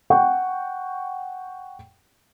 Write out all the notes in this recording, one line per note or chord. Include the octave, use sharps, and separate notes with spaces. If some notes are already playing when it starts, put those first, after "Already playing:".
F#5 G5 C#6